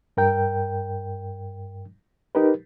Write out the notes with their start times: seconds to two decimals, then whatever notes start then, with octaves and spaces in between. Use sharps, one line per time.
0.17 G2 A#4 G5
2.35 D#4 G4 A#4 B4